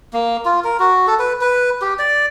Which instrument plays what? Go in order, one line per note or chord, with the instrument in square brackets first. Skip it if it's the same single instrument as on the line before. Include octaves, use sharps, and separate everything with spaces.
[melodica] A#3
F4
A#4
F#4
A4
B4
B4
G4
D5